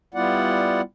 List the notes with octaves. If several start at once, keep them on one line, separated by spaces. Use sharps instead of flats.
G3 B3 E4 F4 D5 F#5